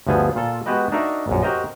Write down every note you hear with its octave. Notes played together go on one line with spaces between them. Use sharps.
G1 D2 F3 B3 G#4 A4
A#2 F4 A4
G#3 B3 F#4 G4 B4 D#5
D4 D#4 F#4 A#4 D5 E5
A#1 F#2
F#4 G4 A#4 C5 D#5